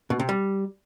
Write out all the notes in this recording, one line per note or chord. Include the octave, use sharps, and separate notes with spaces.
B2
C3
G3